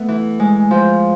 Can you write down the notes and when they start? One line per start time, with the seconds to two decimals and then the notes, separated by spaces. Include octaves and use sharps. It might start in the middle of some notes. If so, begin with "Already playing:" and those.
Already playing: A3 B3
0.08 E3
0.40 G#3
0.71 F3